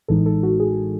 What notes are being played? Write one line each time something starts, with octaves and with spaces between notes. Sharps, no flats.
A1 A2 E3 G#3 D#4 A4
A4
F#4
G#4